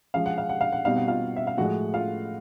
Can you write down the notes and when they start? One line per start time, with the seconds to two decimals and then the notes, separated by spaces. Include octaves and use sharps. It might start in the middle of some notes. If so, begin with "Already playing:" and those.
0.14 F3 G#3 C#4 F5
0.26 F#5
0.38 F5
0.49 F#5
0.61 F5
0.72 F#5
0.85 B2 G3 C4 D#4 F5
0.96 F#5
1.08 F4 F5
1.36 E5
1.47 F5
1.58 A2 F3 G#3 F#4 F#5
1.94 F4 F5